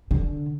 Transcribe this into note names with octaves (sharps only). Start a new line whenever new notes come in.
D3